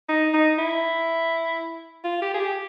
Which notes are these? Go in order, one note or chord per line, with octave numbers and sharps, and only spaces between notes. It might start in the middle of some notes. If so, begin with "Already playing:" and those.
D#4
D#4
E4
F4
G4
G#4
G4